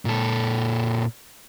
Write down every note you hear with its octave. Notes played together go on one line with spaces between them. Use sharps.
A#2 A4